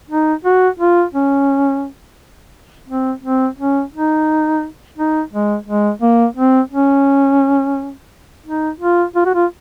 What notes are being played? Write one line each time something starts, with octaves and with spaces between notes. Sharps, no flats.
D#4
F#4
F4
C#4
C4
C4
C#4
D#4
D#4
G#3
G#3
A#3
C4
C#4
D#4
F4
F4
F#4
F4